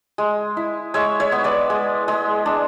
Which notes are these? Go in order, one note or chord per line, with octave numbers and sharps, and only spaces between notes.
G#3
E4
G#3 C#5 E5
C#5 E5
B3
B4 D5
G#3
G#3
D4